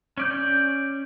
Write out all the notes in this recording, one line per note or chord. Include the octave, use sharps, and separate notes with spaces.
C#4 D5 G6